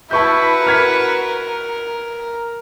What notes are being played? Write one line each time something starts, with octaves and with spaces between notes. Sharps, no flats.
E4 F#4 B4 A5 C#6 G6
A#4 F6 G#6 B6